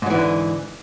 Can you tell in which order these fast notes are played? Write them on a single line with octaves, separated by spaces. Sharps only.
G#2 F#3 E3 D3